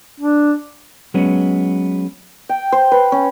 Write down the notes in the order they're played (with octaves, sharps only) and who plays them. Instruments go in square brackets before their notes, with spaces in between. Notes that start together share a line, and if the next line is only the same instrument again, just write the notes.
[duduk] D4
[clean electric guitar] F#3 G#3 B3 C#4
[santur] G5
C5
B4
C#4